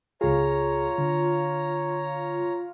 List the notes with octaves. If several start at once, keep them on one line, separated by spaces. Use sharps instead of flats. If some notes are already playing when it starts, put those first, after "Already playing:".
C#2 F4 G#4 C#5 A#5
D3